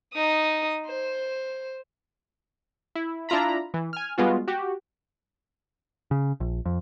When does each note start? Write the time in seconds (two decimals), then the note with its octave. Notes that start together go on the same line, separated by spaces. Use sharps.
0.14 D#4 D#6
0.87 C5
2.95 E4
3.29 D4 E4 F4 A#5 B5
3.74 E3
3.93 G#5 F6
4.18 G3 G#3 B3 F4 F#4
4.48 F#4 G4
6.11 C#3
6.40 A#1
6.66 F2